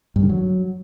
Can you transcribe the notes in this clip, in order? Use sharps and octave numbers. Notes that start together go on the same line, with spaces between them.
G2
D3
F#3